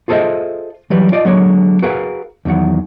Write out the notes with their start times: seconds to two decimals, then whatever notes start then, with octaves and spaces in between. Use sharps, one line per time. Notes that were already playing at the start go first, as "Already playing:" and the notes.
0.08 F4 G#4 A4 C5 D#5 E5
0.90 E3 F#3 G3 B4
1.12 F4 D5 D#5
1.25 D3 F#3 G#3 A#3 C#5
1.82 F#4 G#4 A#4 B4 F5
2.45 E2 D#3 F#3 F#5